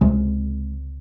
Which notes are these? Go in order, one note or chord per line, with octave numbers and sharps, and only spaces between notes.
C#2 C3 G#3